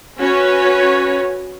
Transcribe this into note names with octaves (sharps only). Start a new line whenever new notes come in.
C#4 F#4 B4 C#5